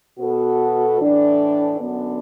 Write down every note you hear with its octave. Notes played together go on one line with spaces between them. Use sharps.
B2 B3 F#4 A4
A2 E3 D4 A4
F#2 D3 B3 D4